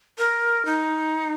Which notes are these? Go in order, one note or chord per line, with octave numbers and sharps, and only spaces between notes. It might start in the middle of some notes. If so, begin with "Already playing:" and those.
A#4
D#4